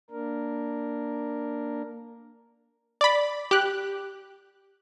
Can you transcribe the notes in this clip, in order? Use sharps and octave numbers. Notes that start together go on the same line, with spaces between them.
A#3 D4 A#4
D5 B5
G4 F#6